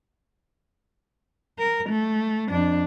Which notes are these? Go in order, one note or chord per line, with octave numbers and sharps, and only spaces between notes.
A#4
A3
F2 D4